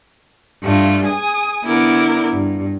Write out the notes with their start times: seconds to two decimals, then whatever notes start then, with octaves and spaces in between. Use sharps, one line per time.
0.62 G2 A3 F4
1.04 G#4 G#5 D#6
1.65 D3 B3 E4 A#4 D6
2.32 G2